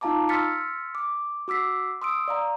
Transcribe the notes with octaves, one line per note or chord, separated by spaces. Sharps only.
D#4 F4 F5 A5 A#5 D6
C6 E6 F6 A6 B6 C#7
D6
F#4 D6 E6 B6 C7
C6 D#6 E6 D7
D5 F5 A#5